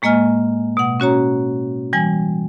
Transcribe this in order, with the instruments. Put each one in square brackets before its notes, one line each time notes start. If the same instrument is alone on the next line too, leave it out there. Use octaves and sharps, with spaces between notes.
[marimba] A2 G#3 A#3 D#5 G#5 F6
B2 F#5
C#4 F#4 C#5 A#5
E3 G3 G#5